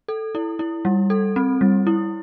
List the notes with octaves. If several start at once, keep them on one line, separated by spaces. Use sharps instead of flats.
A4
E4
E4
G3
A4
C4
G3
E4